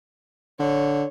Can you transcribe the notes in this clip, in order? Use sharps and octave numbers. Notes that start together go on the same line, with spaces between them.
D3 C#5